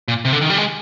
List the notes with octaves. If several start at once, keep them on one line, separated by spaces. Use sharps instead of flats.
A#2
C3
D3
D#3
G3
G#3